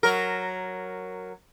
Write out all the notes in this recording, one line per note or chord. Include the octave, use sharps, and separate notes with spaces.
F#3 A#4